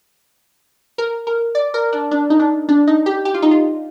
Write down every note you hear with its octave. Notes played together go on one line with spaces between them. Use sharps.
A#4
A#4
D5
A#4
D4
D4
D#4
D4
D4
D#4
G4
G4
F4
D#4
F4